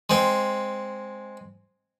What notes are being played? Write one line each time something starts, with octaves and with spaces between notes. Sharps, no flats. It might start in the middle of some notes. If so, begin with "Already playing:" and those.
G#3 C4